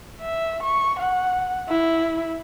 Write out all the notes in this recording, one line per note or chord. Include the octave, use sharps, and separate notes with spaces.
E5
C#6
F#5
E4